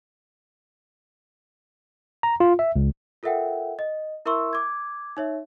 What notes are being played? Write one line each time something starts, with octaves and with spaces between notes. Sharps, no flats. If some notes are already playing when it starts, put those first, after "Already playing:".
A#5
F4
E5
C#2
F4 A4 A#4 E5 F#5 G5
D#5
E4 A#4 E5 C6 C#6 E6
D6 G#6
D#4 C#5 E5